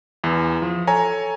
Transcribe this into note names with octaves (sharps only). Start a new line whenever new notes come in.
E2 E3
F3
A4 C#5 G#5 A#5